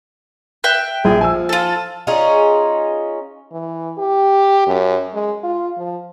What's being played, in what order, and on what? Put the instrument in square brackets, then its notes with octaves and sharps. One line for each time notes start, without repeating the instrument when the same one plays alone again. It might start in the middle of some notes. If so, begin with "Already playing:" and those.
[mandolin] E5 G5 F#6
[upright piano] A#1 F3 [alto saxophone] G#4
[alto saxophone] F3 [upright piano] G#5 E6
[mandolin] F4 A4
[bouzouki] C#4 D#4 F4 G#4
[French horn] E3
G4
F#2
G#3
F4
F3